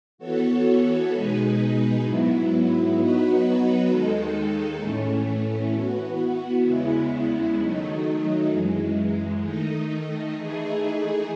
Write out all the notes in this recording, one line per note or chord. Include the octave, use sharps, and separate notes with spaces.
E3 B3 F#4 A4 C#5
B2 G#3 D#4 G#4 B4
G#2 F#3 B3 E4
F#3 B3 D#4 F#4 B4
D#2 D#3 G#3 D#4 A4
A2 E3 A3 C#4
E3 B3 F#4
E2 C#3 G#3 B3 E4
D#3 F#3 A3 D#4
F#2 E3 G#3
D#3 A3 D#4
E3 A3 D#4 G#4